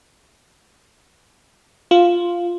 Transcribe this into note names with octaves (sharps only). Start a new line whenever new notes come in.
F4